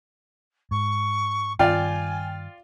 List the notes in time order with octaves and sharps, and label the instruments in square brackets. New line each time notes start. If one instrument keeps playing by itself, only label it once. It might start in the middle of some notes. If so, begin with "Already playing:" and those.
[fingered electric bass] G#2 [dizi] C#6
[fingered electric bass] G2 D#3 C4 [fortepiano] F4 D5 F5 [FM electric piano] G5 [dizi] G#5